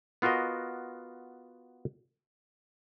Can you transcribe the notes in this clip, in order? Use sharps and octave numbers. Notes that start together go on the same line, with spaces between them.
B3 F4 F#4 A#4 D#5